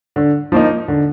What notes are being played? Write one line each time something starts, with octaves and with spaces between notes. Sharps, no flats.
D3
F3 A#3 D#4
D3